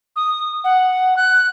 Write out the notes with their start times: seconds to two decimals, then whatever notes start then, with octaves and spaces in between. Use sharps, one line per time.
0.16 D#6
0.64 F#5
1.17 F#6